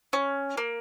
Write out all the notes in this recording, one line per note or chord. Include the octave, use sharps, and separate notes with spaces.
C#4
A#3